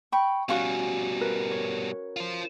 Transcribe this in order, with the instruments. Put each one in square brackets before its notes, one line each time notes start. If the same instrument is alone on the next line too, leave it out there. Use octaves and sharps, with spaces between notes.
[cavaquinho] G5 B5 [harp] C#6
[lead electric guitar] B2 G3 [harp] C#4 F#4 [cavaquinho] F5 C#6
[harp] A#4 B4
C#5
[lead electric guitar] F4 C5